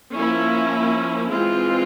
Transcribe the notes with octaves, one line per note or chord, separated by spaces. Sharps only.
F3 A#3 C#4 E4
E3 G#3 C4 F4